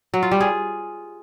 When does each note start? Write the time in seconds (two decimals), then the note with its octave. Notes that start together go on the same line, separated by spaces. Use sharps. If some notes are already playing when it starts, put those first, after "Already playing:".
0.14 F#3
0.23 F4
0.31 G3
0.40 G#4